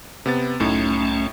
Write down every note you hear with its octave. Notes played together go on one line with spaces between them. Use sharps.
C3 B3 A6
C2 F#2 A2 A3 C#4 D#4